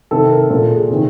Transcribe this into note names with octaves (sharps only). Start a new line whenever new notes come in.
C3 D#3 A4
A#4
A#2 A4
G#4
C3 D#3